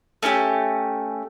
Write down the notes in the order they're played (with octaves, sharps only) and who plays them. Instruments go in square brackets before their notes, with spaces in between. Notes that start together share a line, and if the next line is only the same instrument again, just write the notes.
[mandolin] A3 C#4 E4 G4